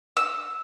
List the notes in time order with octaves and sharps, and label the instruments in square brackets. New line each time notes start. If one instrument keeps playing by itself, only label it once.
[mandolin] E6